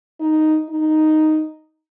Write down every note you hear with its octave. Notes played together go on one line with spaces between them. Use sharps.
D#4
D#4